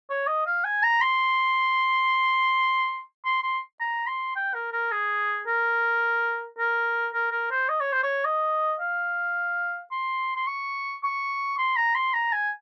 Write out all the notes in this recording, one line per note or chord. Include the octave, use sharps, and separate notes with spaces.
C#5
D#5
F5
G#5
A#5
C6
C6
C6
A#5
C6
G5
A#4
A#4
G#4
A#4
A#4
A#4
A#4
C5
D#5
C#5
C5
C#5
D#5
F5
C6
C6
C#6
C#6
C6
A#5
C6
A#5
G#5